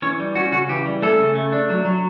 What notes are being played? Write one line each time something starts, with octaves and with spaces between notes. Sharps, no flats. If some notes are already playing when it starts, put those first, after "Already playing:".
E3 C#4 C#5
G3
C#4 F#4
C#3 F#4
E3 G4
G3
A3 C#4 A4
C#3
A3
D4
F#3
F#3